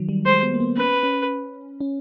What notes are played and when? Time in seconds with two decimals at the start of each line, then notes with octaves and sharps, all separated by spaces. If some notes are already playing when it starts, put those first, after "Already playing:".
Already playing: D#3 F#3
0.09 G3
0.25 G#3 C5
0.43 B3
0.54 A#3
0.60 B3
0.77 C#4 B4
1.03 C#4
1.80 C#4